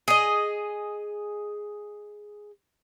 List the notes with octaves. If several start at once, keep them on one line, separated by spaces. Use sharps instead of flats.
G#4 D#5